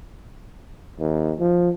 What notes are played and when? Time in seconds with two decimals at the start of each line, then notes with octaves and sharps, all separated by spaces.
1.00 D#2
1.39 F3